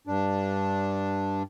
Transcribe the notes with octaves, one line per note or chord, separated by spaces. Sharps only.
G2 D4